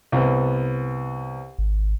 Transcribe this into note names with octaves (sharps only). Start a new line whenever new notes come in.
C2 B3
G#1